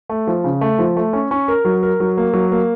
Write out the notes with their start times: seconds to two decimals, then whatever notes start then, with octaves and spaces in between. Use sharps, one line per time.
0.10 A3
0.27 F3
0.44 C#3
0.61 A3
0.79 F3
0.97 A3
1.13 C#4
1.31 C#4
1.48 A#4
1.65 F#3
1.83 A#4
2.00 F#3
2.17 A#3
2.33 F#3
2.52 A#3